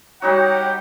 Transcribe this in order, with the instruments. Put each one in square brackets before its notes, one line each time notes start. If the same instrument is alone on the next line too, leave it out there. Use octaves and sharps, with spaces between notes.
[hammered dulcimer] G3 D#4 F#4 [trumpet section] G4 F#5 A#5 [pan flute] C#5